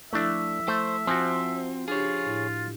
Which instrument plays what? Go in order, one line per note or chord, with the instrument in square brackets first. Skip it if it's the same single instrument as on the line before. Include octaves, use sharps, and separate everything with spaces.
[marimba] F3 E4 A4 [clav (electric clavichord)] A3 D4 [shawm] E5
[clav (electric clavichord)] A3 [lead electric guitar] C5
[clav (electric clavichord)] F3 F#4 [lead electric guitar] C4 [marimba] G#5
[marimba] D4 G4 [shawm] F4 [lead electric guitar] G#4 C#5
[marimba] A2 E4 A6